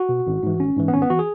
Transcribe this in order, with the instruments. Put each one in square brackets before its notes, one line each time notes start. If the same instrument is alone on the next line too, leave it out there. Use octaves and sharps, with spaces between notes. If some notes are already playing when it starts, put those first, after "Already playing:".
Already playing: [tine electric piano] F#4
B2
G#1
G#2 E3
G#1 C#4
G#2 E3
B3
G#1 C#4
B3
E3 F#4
G#4